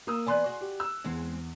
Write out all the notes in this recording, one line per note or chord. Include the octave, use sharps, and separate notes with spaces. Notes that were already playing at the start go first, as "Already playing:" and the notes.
A#3 D#6 E6
E3 B3 D5 G#5 C6 F#6
F#4 G#4
G4
E6
E2 G#3 C4